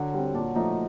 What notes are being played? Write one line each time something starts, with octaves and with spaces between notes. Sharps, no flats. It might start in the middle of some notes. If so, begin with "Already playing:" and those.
Already playing: D3 F#3 F#4
G3 C4
A#2 D4
F3 A3 D#4